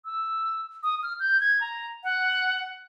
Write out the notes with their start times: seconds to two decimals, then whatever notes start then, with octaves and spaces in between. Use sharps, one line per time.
0.05 E6
0.83 D#6
1.03 F6
1.20 G6
1.40 G#6
1.61 A#5
2.03 F#5